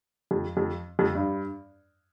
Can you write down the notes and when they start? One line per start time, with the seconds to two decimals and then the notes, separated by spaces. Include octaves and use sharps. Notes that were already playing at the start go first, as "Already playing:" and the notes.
0.31 F2
0.57 F2
0.99 F2
1.15 G2